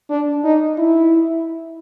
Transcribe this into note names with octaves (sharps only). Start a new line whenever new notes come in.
D4
D#4
E4